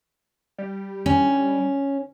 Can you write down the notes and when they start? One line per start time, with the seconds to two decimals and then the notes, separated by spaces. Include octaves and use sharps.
0.58 G3
1.06 C#4